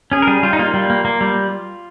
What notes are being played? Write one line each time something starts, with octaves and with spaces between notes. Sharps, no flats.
C#4 G#4
A#4
G3 G#4
G3 F4
D#4
A#3 F4
G3
A#3
A#3
G3